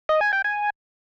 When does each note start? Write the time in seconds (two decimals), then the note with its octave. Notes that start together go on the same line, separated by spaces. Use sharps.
0.09 D#5
0.21 G#5
0.33 G5
0.44 G#5